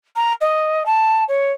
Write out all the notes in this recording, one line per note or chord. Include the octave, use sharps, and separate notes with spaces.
A#5
D#5
A5
C#5